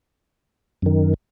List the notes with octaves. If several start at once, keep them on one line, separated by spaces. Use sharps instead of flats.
F#2 D#3